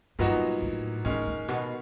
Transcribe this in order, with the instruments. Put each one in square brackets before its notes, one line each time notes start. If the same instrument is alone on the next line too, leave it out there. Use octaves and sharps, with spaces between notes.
[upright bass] G2 [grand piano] A#2 F#3 B3 D#4 F#4
[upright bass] A2
[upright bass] A2 [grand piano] D#3 G#3 C#4
[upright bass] A2
B2